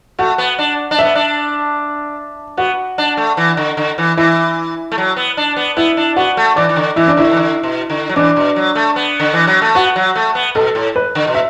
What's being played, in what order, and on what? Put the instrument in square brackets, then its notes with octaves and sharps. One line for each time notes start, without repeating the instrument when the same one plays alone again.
[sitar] A3 [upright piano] F#4
[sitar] B3
D4
D4
[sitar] B3 [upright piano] E5
[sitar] D4
[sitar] B3 [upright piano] F#4
[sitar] D4
A3
E3
D3
D3
E3
[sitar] E3 [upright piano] E4
[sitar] A3
F#3
B3
D4
B3
[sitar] B3 [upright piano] E4
[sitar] D4
[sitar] B3 [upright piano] F#4
[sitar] A3
[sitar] E3 [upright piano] D5
[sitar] E3
D3
[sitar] E3 [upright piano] E4
[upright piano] D4
[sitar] D3 [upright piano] E4
[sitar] E3
D3
B2
D3
F#3
[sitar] E3 [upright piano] D4
[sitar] B2
F#3
A3
B3
D3
E3
F#3
A3
[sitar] B3 [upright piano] F#4
[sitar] F#3
A3
B3
[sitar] B2 [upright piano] A4
[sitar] A2
[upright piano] B4
[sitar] D3
B2
[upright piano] E5